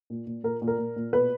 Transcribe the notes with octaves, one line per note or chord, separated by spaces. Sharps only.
A#2
A#2
A#2 A#4
A#2
A#4
A#2
A#2
B2 B4